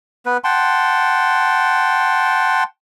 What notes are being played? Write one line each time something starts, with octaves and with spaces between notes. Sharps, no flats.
B3 B4
F#5 G5 A5 C6